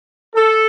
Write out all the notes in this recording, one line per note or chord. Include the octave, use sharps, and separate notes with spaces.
A4